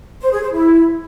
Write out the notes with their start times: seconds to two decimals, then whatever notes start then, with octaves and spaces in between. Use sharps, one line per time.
0.21 C5
0.31 G#4
0.42 C5
0.53 E4